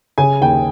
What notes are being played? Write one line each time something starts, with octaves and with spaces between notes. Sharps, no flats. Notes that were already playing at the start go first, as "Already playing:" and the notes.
C#3 G#5
D#2 G5